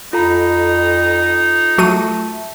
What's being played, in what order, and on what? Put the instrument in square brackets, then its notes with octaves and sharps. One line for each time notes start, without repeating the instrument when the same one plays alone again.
[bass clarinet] F2 [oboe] D#4 [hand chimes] F4 A4 A#5
[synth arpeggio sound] F#3 F#4 D#7 [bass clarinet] A3